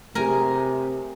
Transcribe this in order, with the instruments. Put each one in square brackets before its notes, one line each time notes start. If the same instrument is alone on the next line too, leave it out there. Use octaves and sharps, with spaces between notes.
[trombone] C3 [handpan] A3 G4 G#4 [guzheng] A#4 G#5